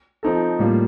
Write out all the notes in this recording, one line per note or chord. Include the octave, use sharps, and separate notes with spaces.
F3 C4 D#4 A4
A2 G3 A#3 F4